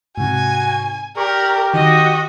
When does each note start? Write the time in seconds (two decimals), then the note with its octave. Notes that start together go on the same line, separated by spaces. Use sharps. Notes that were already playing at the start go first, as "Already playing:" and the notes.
0.18 G#2 C3 F#4 G#5
1.17 G4 A#4 D5 A#5 C#6
1.74 D#3 F#4 D#5